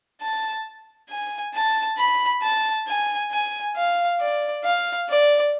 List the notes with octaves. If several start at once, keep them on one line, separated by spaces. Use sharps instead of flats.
A5
G#5
A5
B5
A5
G#5
G#5
F5
D5
F5
D5